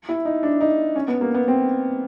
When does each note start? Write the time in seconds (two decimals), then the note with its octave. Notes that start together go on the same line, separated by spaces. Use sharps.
0.09 E4
0.25 D#4
0.43 D4
0.60 D#4
0.96 C#4
1.08 B3
1.21 A#3
1.34 B3
1.48 C4